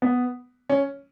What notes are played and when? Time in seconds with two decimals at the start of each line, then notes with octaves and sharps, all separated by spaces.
0.02 B3
0.69 C#4